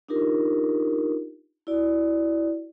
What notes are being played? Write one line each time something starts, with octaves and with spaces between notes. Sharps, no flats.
D4 D#4 F4 G4 A#4
E4 F#4 D5